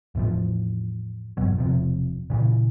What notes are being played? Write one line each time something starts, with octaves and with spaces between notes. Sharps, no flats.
E2 A2 F3
E2 G2 B2 F#3
E1 C3 F3
A#2 C#3 E3